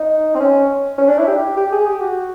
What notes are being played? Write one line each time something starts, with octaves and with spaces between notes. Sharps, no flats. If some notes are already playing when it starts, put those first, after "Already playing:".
Already playing: D#4
C4
C#4
C#4
D4
E4
G4
G4
G#4
G4
F#4